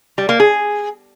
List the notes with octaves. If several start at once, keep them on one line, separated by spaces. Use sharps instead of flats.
G3
A#3
G#4